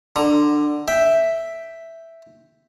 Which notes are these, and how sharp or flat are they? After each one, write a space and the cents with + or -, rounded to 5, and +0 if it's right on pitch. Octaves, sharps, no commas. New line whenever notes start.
D3 +15 A#5 +10
E5 +0 G5 +0